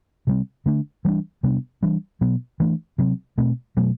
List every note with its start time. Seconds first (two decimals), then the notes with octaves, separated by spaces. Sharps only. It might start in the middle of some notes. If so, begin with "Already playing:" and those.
0.27 C3 G3 C4
0.66 D3 A3 D4
1.05 E3 G3 B3 D4
1.43 C3 G3 B3 D4
1.82 E3 G3 D4
2.21 B2 F#3 B3
2.60 E3 A3 D4
2.98 C3 F#3 C4
3.38 B2 A3 C4
3.77 B2 F#3 A3